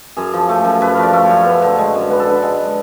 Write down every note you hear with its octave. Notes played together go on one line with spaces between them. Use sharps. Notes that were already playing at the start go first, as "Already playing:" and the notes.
F#2 G#4
F3
A3
F#2
F#2 B4
F3 F5
D5
A3
C#5
F#2
B3
D3
G#3
F#2
B3 B4
A4
D3 B4
G#3